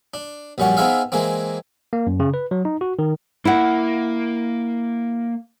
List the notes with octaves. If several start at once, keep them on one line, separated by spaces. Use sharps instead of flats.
D4
A#1 F#2 G3 C#4 F#5
B3 C4 D#4 G#4 E5 F5
E3 G#3 A#3 C4
A#3
F#2
C#3
B4
F#3
D#4
F#4
D#3
A#3 E4 F#5